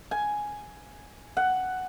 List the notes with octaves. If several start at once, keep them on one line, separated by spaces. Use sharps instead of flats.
G#5
F#5